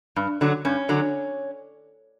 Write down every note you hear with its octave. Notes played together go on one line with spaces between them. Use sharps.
G2
D3 F#3
G2 C#4
D3 F#3